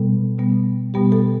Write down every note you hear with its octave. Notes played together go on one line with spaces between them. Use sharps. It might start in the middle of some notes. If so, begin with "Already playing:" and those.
Already playing: B2 G3 B3 A4
B2 G3 B3
B2 G3 B3 G4
A4